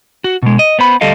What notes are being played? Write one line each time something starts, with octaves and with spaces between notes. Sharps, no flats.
F#4
B2 G#3
D#5
B3 C5 B5
D2 G3 A4 D#5 F5